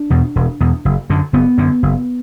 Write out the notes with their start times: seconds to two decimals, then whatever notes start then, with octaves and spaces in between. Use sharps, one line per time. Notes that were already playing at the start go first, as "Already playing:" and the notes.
Already playing: D4
0.10 E2 B2
0.36 E1
0.61 E2 B2
0.85 F#1
1.10 F#2 D3
1.33 F#1 B3
1.58 F#2 D3
1.83 F#1